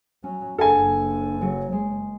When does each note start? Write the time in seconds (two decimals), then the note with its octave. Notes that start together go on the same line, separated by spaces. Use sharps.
0.24 F#3 C#4
0.58 F#1 F#2 D4 G#4 A4 F#5 G#5
1.41 C#3 F#3 C#4
1.72 G#3